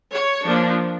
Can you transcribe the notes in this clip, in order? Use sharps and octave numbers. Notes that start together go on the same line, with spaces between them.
C#5
F3 A#3 D4